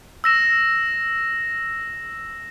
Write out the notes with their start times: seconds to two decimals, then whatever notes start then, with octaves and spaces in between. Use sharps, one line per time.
0.24 E6 A#6 E7